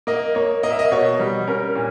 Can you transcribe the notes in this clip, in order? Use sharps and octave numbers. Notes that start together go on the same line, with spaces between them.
A#3 D#5
A#3 C#5
A#3 D#5
E5
D#5
B2 C#5
G3
C#4 A#4
A#2